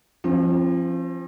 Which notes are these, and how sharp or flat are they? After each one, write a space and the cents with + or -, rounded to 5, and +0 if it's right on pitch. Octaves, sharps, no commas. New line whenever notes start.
F3 -25 C4 +40